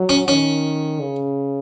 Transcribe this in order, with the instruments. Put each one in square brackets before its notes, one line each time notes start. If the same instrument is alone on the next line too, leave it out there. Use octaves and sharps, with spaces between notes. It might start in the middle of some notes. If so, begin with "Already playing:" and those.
Already playing: [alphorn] F#3
[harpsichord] C#4
[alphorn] D#3 [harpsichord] C#4
[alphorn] C#3